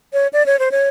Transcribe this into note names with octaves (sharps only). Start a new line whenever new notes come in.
C#5
D5
C#5
C5
C#5